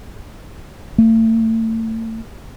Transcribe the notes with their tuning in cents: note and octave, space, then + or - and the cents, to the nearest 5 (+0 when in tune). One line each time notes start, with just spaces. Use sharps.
A3 +35